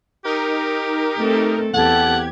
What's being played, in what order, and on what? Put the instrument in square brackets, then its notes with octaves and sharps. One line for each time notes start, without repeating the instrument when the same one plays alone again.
[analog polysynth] D#4 A#4 [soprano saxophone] G4
[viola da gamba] A3 C4 A4
[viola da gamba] E2 C4 [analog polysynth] G4 G#6 [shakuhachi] A4 [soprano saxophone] F#5